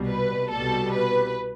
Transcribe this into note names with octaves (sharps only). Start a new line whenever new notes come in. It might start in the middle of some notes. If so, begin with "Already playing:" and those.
Already playing: C2 B2 G3
B4
C2 B2 G3 A4
B4